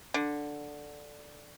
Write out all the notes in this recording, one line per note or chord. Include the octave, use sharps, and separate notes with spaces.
D3